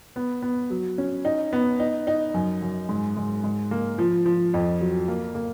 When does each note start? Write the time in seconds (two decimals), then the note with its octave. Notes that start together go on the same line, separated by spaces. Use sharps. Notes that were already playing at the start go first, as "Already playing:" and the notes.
0.16 B3
0.42 B3
0.70 F#3
0.98 C#4
1.25 D#4
1.53 B3
1.80 D#4
2.07 D#4
2.34 F#2
2.62 F#2
2.89 G#2
3.17 G#2
3.44 G#2
3.71 A#3
3.98 F3
4.26 F3
4.54 F2
4.81 F#3
5.08 A#3
5.35 A#3